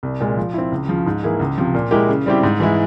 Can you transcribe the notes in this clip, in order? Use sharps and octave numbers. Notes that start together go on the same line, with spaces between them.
C2
A#2 G#3
F3
C4 E4
C#2
C#3 F3
G#2
E3 A#3 E4 G#4
C#2
C3 F3
A#2
G#3 E4 G4 A#4
C#3
G3 C4 E4 G4
G#2
E3 G#3 E4